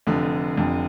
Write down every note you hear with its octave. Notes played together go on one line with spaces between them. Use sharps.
F1 F2 D3
F1 F2 D3